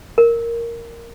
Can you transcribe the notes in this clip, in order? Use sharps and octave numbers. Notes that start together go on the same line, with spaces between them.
A#4